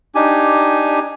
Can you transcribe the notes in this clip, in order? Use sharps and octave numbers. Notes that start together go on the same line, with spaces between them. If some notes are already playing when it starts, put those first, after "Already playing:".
D4 D#4 G4 G#5